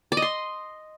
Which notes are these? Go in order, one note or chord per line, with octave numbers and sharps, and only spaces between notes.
D5
D#5
C6